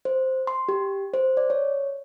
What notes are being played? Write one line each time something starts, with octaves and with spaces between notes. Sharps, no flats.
C5
C6
G4
C5
D5
C#5